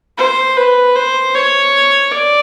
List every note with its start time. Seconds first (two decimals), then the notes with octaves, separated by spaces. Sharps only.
0.18 C5
0.57 B4
0.96 C5
1.35 C#5
2.11 D5